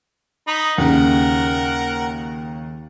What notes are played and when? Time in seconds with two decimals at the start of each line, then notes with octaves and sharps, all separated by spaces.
0.47 D#4 B5
0.78 D#2 C#3 A#4 F#5